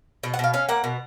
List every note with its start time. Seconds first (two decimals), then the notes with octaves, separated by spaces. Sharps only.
0.23 B2 D#5
0.34 F#5
0.39 B2 F5
0.54 C#4 F5
0.69 A#3 F#5
0.84 B2